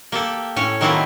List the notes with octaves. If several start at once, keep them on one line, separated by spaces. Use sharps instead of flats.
A#3 G4 A4
A2 C#4 C#5
D#3 F#3 A#3 C4 E4 A4